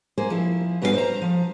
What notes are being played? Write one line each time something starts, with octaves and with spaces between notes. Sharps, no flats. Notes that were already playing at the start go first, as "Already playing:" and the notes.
A#3 G#4 C5
F3 E4
G2 B3 F#4 G#4 B4 F5
C5 A#5
F3